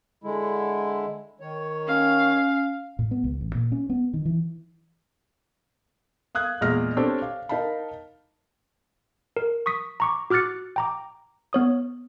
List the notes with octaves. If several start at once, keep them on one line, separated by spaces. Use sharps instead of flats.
D3 G#3 E4
D#3 C#5
C#4 F5
A2
B3
C#2
A1
A#2
C#4
B3
D#3
E3
F5 D#6 F#6 G#6
E2 A#2 G#3 F6 A#6
C4 D4 G4 A4 C#5 G5
F5
D#4 A#4 F5 A5 B5
A#4
C#6 D#6 B6
A#5 C#6 D6
F#4 D6 F6 F#6 A6 C#7
G5 A#5 D6
B3 C#5 D#6